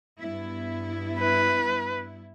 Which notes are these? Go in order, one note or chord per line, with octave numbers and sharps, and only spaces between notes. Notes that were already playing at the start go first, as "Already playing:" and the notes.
G2 B3 E4
B4